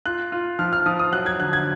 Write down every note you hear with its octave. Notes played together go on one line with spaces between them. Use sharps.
F4 F#6
F4
F3 F6
F6
F3 D#6
D#6
F#3 F#6
G#6
D3 F#6
G#6